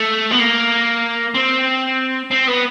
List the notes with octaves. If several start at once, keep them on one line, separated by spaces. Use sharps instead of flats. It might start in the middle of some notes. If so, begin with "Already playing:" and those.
Already playing: A3
B3
A#3
C4
C4
B3